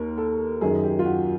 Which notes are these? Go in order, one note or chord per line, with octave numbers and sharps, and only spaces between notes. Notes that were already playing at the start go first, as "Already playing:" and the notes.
Already playing: D#2 A#4
A4
F#2 D#3 G#4
G4
F4
F#4